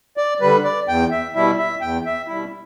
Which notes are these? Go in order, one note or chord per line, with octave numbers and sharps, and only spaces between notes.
D5
D3 G3 B4
D5
E2 G5
E5
B2 G3 E4 E5
E5
E2 G5
E5
B2 G3 E4 E5